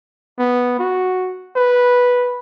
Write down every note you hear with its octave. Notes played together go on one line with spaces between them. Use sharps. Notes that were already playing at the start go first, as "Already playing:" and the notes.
B3
F#4
B4